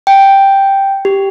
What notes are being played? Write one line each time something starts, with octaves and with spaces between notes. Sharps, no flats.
G5
G4